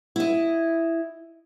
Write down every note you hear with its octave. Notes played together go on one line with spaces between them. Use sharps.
E4 D#5